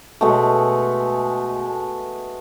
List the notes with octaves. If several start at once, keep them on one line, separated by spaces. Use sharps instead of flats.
B2 G#3 A3